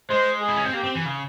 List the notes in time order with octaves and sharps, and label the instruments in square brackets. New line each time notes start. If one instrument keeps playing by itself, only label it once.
[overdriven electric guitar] G#3 [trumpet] C5
[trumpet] G#4
[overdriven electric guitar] E4
C#4
C4
[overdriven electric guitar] A#3 [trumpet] G4
[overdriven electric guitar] C4
E3
C#3